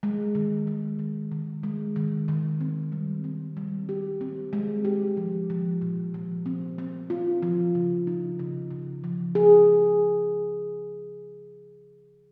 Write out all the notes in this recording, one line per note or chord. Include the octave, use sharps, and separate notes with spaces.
G#3
D#3
G#3
D#3
D#3
G#3
D#3
D#3
C4
G3
C4
G3
G4
C4
G#3
G4
F3
F3
A#2
F3
C4
C4
F4
F3
C#3
D#4
C#3
C#3
F3
G#4